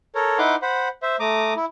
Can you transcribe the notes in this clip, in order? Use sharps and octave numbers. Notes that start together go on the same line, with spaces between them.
A4 A#4 C#5
D#4 E4 B4 F#5 C6 D6
C5 F#5 B5
C5 E5
A3 A#5 D6 D#6
E4